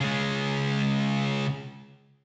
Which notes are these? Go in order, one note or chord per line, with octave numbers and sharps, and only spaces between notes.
C#3 G#3